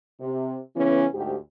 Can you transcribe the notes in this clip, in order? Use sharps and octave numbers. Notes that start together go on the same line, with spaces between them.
C3
C#3 E3 B3 C#4
D2 G#2 G4